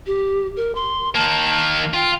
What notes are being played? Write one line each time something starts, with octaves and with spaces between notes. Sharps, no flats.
G4
A#4
C6
D#3 A#3 A5
F4 G5